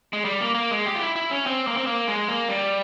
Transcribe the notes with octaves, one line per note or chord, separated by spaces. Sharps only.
G#3
G3
A#3
A#3
G#3
G4
F4
E4
E4
C#4
C4
A#3
C4
A#3
G#3
A#3
G3